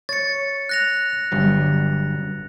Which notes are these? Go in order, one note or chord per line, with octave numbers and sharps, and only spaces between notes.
C#5 A6 C#7
F#6 A#6 F7
G1 G2 F#3